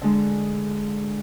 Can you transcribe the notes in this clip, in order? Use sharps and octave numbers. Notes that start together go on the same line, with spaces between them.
D3 G#3